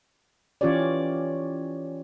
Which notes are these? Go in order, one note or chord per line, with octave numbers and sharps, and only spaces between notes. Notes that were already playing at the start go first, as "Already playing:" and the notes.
E3 C#4 F4 G4 C#5 D5